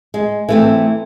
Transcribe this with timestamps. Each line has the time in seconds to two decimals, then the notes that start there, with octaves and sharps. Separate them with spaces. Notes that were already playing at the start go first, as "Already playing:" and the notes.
0.14 G#3
0.49 E3 A3 C4